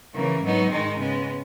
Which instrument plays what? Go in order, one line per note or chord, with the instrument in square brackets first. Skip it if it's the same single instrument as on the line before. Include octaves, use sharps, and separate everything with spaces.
[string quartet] C#3 E3 A#3
G#2 F#3 B3 D#4
G#2 D#3 G#3 D#4
C#3 G#3 B3